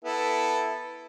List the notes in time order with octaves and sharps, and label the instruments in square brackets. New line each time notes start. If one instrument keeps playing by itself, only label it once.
[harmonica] B3 E4 A4